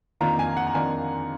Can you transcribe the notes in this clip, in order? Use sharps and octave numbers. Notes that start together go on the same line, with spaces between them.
F2 D#3 A#3 D4 F4 A#5
G#5
F#5
A#5
F2 D#3 A#3 D4 F4 G#5